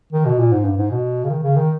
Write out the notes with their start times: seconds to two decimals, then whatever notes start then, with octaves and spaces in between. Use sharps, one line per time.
0.13 D#3
0.26 B2
0.39 A#2
0.52 G#2
0.65 G2
0.77 G#2
0.91 B2
1.24 C#3
1.30 D#3
1.43 C#3
1.56 D#3